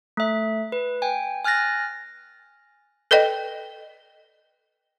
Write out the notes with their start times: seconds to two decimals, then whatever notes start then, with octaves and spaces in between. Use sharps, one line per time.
0.17 A3 E5
0.72 B4
1.02 G5 G#5
1.44 G#5 F6 F#6 A6 A#6
3.11 A4 B4 D5 D#5 G5